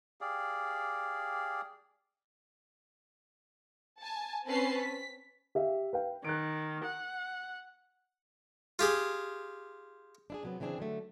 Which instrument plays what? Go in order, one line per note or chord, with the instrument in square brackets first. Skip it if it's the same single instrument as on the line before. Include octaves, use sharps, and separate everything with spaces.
[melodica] G4 G#4 D5 F5
[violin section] G#5 A5
C4 C#4 B4 A5 C7
B6
[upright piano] G4 E5 F5
B4 F5 G5
[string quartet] D#3 [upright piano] F#6 D7
[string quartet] F#5
[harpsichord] F4 G4 G#4
[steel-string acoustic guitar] D4 E4 G#4
C3 F#3 B3
C#3 E3 C4 D4 G#4
D3 F#3 A3